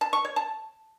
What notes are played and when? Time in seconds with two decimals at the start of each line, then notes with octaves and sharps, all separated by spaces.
0.01 A5
0.13 C#6
0.25 C#5
0.36 A5